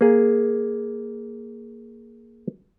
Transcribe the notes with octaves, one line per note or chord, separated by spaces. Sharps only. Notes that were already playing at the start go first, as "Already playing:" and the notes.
A#3 G#4